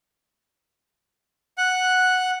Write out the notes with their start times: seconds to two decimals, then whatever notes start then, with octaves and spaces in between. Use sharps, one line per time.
1.58 F#5 F#6